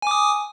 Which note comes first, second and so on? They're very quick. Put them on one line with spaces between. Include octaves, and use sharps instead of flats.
G#5 D6 D#6